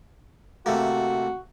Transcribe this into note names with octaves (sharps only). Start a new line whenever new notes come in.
C3 A3 A#3 F#4